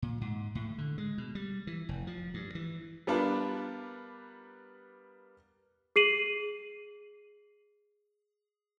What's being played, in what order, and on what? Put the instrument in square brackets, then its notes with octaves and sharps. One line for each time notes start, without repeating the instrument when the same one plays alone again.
[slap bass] A#2
G#2
A2
D3
G#3
B2
G3
E3
F1
F3
G2
E3
[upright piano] G3 B3 D4 F4 A#4 B4
[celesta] G#4 C7 D#7 F#7